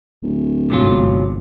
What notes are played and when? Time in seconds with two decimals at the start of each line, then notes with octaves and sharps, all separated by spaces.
0.23 D1
0.70 G1 G#2 C3 F#3 F4